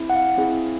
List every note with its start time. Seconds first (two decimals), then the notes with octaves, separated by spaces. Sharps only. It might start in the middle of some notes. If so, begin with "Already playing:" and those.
Already playing: C4 E4 G#4
0.10 F#5
0.16 F5
0.37 C4 E4 G#4